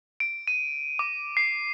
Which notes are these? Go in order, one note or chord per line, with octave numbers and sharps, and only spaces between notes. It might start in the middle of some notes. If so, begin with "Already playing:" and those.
D7
D#7
D6
C7